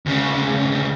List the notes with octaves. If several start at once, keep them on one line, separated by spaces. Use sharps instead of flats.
D2 C#3